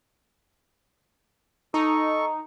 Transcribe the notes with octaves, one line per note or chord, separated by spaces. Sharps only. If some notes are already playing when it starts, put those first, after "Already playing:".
D#4 A4 C#6